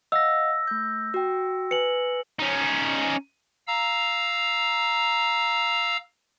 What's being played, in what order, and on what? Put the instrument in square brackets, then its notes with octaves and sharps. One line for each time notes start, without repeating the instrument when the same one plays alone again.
[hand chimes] D#5 F5 F#5 [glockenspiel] E6 A#6
[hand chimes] A3 G6
F#4 G5
[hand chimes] B4 G#5 [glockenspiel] C#7 F#7
[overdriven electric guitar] C#4 D#4
[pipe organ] F5 A#5 E6